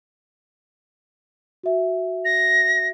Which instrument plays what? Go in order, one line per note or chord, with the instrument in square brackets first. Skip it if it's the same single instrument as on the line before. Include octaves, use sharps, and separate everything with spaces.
[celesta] F#4 E5
[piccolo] A#6